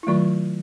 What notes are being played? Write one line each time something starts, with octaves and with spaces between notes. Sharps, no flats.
E4
D#3 F#3 A3 F4